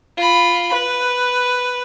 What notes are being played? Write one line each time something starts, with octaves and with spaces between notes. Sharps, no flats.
F4 B5
B4